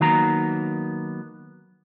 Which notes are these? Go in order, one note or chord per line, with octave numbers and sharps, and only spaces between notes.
D#3 F#3 A#3 B3 A#5